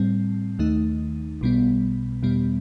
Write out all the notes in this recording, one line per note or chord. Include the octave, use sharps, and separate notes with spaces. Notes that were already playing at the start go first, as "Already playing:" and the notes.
Already playing: A2 G3 C4
D#2 D#3 A3 D#4
B1 B2 G3 B3
E2 B2 G3 B3